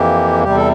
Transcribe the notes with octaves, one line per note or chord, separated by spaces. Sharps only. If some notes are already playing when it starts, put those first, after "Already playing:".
Already playing: F2 E3 A#3 G4
E2 C3 G3 G4
A4